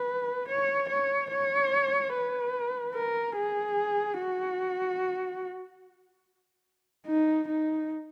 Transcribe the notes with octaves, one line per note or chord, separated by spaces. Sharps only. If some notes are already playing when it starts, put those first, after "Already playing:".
Already playing: B4
C#5
C#5
C#5
B4
A#4
G#4
F#4
D#4
D#4